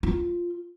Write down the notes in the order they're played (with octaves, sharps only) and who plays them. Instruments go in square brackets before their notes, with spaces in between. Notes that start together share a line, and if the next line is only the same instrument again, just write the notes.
[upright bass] F4